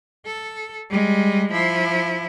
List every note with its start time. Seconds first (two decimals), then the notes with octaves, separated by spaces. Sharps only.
0.26 A4
0.90 G3 G#3
1.51 F3 E4